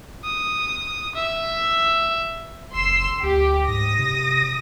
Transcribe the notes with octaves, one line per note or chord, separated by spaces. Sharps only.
D#6
E5
F#1 C6 E6 C7
D2 G4
G#2 D#6 A#6
C3